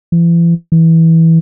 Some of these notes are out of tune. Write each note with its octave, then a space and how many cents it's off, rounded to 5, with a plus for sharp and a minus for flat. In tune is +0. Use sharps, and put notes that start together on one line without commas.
E3 +40
E3 -15